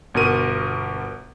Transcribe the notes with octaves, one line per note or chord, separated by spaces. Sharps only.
G1 B2 A#4 D#7